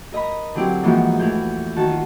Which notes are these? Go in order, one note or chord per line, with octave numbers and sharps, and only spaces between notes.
A#4 D#5 A#5 B5
D3 F#3 C4 E4 G4 C5
G#2 E3 F3 A#3 B3 F#4
E2 A2 E3 B3 G6
D#3 F#4 A5
F4